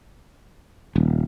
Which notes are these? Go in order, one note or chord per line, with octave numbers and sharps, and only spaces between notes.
D#1